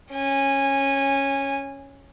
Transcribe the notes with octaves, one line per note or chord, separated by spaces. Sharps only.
C#4 G#5